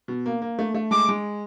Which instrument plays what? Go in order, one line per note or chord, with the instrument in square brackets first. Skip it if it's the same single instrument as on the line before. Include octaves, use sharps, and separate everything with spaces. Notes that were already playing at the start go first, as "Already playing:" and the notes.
[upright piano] B2
A#3
A#3
A3
A3
[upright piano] G#3 [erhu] D6
[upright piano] G#3